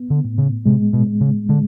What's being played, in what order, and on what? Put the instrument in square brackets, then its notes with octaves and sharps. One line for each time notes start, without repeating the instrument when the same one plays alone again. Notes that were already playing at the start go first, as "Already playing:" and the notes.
Already playing: [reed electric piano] B3
[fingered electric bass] D3
[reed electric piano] A2
[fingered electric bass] C#3
[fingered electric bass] C3 [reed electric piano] G#3
[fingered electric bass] B2
[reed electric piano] G#3
[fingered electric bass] C#3
[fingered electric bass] D3 [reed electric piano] G#3